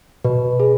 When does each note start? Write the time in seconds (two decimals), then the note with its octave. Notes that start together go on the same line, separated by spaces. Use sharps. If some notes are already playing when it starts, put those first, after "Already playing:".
0.25 B2 B4
0.60 G#4